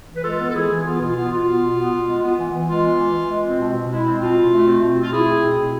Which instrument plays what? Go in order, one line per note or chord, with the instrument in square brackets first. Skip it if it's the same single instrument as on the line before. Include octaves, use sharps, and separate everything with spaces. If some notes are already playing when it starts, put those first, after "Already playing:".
[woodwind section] E3
B4
G#3 F4 A4
B3
A4
E3 E4 G#4
E3
B3 F4
B2 F4
B3 F4
B2 F4
B3
B2
B3
B2
G#3
B3
E3
E3
G#3 F4
B3
E3
E3
G#3
C4
B2
B2
G#3 E4
C4
B2 F4
B2
A3
C4
B2
B2
F4
A3 E4 G#4
C4
B2
B2